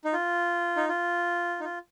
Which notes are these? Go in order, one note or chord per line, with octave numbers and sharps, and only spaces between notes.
D#4
F4
D#4
F4
D#4
F4